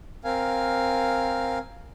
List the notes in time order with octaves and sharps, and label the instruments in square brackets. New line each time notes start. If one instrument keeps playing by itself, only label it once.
[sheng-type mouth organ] C4 A#4 F5 G#5